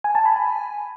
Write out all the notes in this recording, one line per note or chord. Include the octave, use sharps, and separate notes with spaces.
G#5
A5
B5
G#5